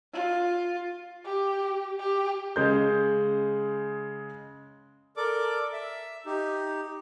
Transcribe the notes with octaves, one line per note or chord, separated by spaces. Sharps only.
F4
G4
G4
C#3 G#3 G6
A4 A#4 D5 D6
E5
D#4 G4